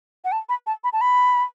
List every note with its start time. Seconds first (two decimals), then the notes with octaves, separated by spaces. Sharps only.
0.25 F#5
0.32 A5
0.49 B5
0.67 A5
0.84 B5
0.93 A5
1.01 B5